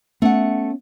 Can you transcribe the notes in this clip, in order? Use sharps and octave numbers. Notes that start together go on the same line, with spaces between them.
A3 B3 C#4 F#5